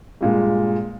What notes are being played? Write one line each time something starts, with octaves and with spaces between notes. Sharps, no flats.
G2 A#2 G#3